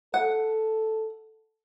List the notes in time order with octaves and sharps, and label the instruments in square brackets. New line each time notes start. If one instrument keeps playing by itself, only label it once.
[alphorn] A4 [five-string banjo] F#5